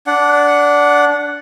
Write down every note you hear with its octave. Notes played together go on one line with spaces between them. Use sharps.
D4 F#5